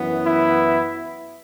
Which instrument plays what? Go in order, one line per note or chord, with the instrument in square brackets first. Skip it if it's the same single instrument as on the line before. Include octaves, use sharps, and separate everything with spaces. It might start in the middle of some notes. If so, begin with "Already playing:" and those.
Already playing: [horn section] F#2 E3 B3
E4